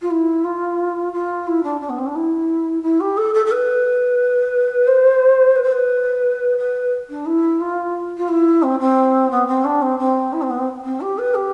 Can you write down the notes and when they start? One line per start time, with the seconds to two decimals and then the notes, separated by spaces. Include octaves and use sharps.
0.01 F4
0.10 E4
0.44 F4
1.12 F4
1.47 E4
1.63 D4
1.80 D4
1.89 B3
1.97 C4
2.06 D4
2.15 E4
2.82 E4
3.00 G4
3.17 A4
3.34 A4
3.45 A4
3.51 B4
4.87 C5
5.55 B4
5.63 C5
5.71 B4
6.57 B4
7.09 D4
7.25 E4
7.60 F4
8.17 F4
8.28 E4
8.62 C4
8.79 C4
9.30 B3
9.46 C4
9.64 D4
9.81 C4
9.98 C4
10.32 E4
10.41 C4
10.49 B3
10.58 C4
10.83 C4
11.00 G4
11.18 B4
11.34 G4